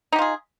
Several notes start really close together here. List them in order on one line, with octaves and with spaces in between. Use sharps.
D#4 G4 F4 G#4